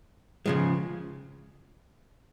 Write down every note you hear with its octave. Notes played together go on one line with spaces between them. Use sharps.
C#3 F3 G#3